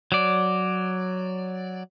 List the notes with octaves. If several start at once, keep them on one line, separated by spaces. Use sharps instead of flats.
F#3 D5